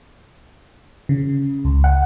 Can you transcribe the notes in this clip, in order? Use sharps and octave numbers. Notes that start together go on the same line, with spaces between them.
C#3
C#2
F#5